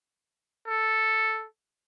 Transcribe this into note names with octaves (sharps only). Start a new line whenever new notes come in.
A4